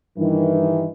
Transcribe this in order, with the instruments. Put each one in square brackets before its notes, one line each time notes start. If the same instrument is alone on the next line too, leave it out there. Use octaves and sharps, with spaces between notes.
[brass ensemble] G2 D#3 E3